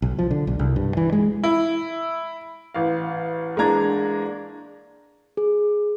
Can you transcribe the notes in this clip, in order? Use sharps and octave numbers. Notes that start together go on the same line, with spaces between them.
B1
F3
D3
B1
C2
G2
E3
G#3
E4
A1 F5
A1 G#3 A#3 D4 A#5 G#6
G#4